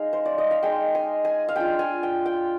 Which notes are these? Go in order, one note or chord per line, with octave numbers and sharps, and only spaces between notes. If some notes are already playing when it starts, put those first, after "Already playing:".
Already playing: G#3 D#4 F5
C5
D5
D#5
F5
G#3 D#4 G5
G#5
G#5
F5
G#3 D4 F4 G5
G#5
G5
G5